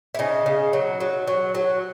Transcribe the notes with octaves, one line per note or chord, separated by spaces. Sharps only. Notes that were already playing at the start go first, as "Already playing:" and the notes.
E4
C#3 D#4
C#3
F#3
F#3
F#3
F#3